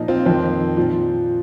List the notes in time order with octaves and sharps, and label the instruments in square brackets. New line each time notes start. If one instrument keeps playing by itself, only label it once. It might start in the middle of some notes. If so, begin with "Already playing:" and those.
Already playing: [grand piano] A#2 F3 D#4
C4 F4
F2 D#3 C4
A#2 F3